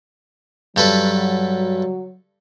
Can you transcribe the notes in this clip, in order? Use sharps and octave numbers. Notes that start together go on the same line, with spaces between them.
G2 F#3 A4 B4